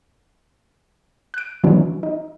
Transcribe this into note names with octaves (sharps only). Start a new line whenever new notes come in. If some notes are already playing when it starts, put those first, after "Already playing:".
F#6 D7
D#3 E3 F#3 B3 C#4 D4
D#4